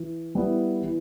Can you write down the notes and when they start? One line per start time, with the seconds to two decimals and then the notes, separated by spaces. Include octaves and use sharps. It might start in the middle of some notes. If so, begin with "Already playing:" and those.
Already playing: E3
0.35 G3 B3 E4
0.82 E3